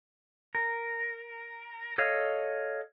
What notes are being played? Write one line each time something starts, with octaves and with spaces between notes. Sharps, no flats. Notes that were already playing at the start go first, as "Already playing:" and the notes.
A#4
A4 C#5 D#5 F5